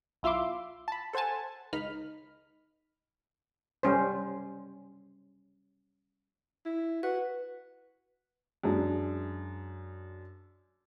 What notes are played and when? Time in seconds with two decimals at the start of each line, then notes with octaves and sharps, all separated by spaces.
0.23 B1 E4 F4 E5 C6 D6
0.88 A5 B5
1.13 A4 C5 F#5 G#5 A5
1.73 C#2 D#4 B5 F6
3.83 G3 C#4 C5
6.65 E4
7.03 F#4 B4
8.63 F#2 G#3 D4